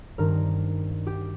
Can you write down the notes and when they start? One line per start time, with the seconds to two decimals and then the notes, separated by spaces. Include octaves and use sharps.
0.18 G2 D#3 C4 A#4
1.07 G4